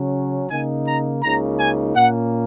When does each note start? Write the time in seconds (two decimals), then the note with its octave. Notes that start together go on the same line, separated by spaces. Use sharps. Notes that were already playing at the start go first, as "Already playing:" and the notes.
Already playing: C#3 F#3 C#4
0.50 C#3 A#3 D#4 G#5
0.87 A#5
1.23 C#2 C#3 A#3 D#4 A#5
1.60 G#5
1.96 A#2 A#3 C#4 F#5